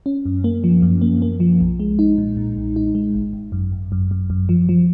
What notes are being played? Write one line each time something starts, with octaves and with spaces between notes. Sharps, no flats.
C#4
F#2
A#3
F3
F#2
A#3
A#3
F3
B1
G#3
D#4
A#2
A#2
B1
D#4
G#3
G#1
G#1
F#2
G#1
F#2
F#2
F#2
F3
F3